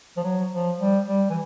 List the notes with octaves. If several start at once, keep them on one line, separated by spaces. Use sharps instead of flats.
F3
F#3
F3
G3
G3
E3